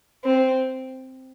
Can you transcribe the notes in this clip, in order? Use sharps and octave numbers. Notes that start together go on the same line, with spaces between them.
C4